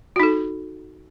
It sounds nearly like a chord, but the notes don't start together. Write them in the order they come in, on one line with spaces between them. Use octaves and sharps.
F#4 D#4 A4